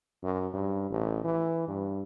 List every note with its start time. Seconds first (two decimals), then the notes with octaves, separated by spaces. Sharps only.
0.23 F#2
0.54 G2
0.90 A1
1.24 E3
1.68 G2